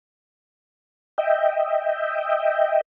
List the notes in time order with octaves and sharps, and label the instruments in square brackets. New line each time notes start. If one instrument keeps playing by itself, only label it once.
[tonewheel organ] D#5 E5 G5